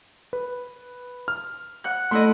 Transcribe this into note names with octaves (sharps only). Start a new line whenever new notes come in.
B4
F6
F#5 F#6
A3 E4 D#5 C6